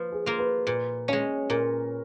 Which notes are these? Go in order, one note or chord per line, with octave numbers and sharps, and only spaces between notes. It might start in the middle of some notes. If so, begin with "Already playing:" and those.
Already playing: F3 A#3 B4
G#4
A#3 F4
B4
A#2 B4
G#3 C#4 C#5
A#2 A#4